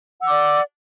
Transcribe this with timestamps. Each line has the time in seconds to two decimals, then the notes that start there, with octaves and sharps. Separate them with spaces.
0.20 F#5
0.23 E6
0.26 D6
0.29 D5